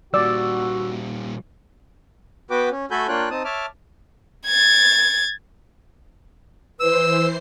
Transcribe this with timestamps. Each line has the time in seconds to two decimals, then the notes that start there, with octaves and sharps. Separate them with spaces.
0.14 A#2 G3 F#4 D5 E6
2.51 B3 F#4 B4 G5 D6
2.71 C#4
2.91 A3 F#4 A4 G#5 B5 G6
3.08 A#3 D4 F4 C#5 G5 F#6
3.31 C4 D#4 A5 D#6
3.45 C#5 E5 A5 D6 F6
4.46 G#6 A6
6.80 E3 B4 C5 E6 C7